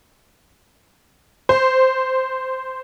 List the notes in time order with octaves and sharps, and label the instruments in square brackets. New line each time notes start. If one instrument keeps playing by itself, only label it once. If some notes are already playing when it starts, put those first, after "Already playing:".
[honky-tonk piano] C5